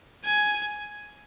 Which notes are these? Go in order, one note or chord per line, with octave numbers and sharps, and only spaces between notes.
G#5